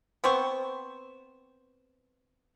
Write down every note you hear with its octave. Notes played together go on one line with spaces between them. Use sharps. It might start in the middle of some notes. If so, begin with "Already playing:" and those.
B3 C4 C5 C#6